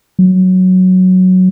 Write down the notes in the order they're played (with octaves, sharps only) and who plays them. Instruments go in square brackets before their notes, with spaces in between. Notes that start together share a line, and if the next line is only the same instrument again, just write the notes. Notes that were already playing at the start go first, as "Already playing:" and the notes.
[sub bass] F#3